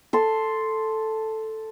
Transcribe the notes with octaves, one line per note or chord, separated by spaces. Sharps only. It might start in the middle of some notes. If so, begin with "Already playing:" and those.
A4 C6